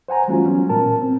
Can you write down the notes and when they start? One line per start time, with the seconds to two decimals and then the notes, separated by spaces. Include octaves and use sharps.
0.08 C5 F#5 G#5 A#5
0.28 E3 G3 A3 C#4 F4 F#4
0.46 F#3 B3 C#4
0.69 A#2 A#4 A5
1.02 C4